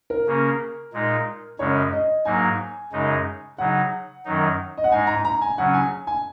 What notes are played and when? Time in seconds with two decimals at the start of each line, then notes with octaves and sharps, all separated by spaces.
0.10 A#4
0.27 C#3 A#3 C#4
0.93 A#2 G#3 D#4
1.59 F#2 C#3 G#3 C#4 C#5
1.93 D#5
2.25 G#2 F#3 A#3 D#4 G#5
2.92 F#2 C#3 G#3 D#4
3.58 C#3 F#3 D#4 F#5
4.25 F#2 D#3 F#3 D#4
4.78 D#5
4.84 F#5
4.91 G#2 G#3 D#4 G#5
5.07 A#5
5.25 A#5
5.41 G#5
5.57 C#3 F#3 C#4 F#5
5.74 G#5
6.07 G#5